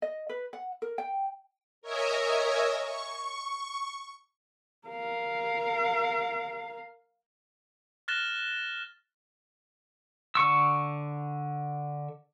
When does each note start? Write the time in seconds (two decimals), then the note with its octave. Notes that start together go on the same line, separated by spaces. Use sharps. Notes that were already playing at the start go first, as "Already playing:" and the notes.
0.02 D#5
0.29 B4
0.53 F#5
0.82 A#4
0.98 G5
1.82 A#4 C#5 D#5 E5 G#5 A#5
2.78 C#6
4.88 A#4 F5
8.08 F6 F#6 A6 A#6 E7 G7
10.35 D3 C#6 E6